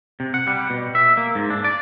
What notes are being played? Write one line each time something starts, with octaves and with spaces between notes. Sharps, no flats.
C3
F#5
G3
B2
E5
A#3
G#2
D4
D5